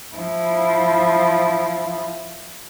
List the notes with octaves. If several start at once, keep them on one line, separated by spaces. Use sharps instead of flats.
F3 E4